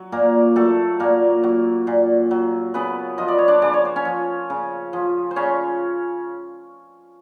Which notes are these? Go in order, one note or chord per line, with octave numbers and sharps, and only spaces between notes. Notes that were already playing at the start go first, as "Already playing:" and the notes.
Already playing: F#3
A#2 A#3 A#4
F#3 A3 A4
A#2 A#3 A#4
F#3
A#2
F#3
C#3 B3 B4
F3 D#5
D5
C#5
D4 D5
C#3 D5
C#5
C5
C#4 C#5
F3
C#3
F3
C5
C#3 C#4 C#5